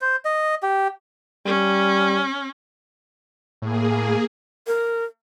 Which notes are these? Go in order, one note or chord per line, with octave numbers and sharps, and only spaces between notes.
C5
D#5
G4
G3 C#4
A2 A#3 G#4
A#4